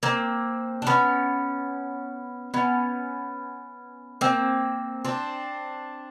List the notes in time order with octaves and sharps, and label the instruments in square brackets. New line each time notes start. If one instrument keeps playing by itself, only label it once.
[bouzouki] A#3 C4
D4
B3 C#4
B3 C#4
A#3 C4
C4 D4